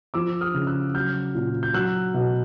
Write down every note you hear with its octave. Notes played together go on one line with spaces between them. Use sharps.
F3 D6 E6
D#6 F6
C#3
E6 F#6
F#3 F6 G6
A#2
G6
F#3 E6 F#6
B2